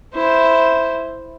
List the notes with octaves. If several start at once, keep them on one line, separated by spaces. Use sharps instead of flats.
E4 C5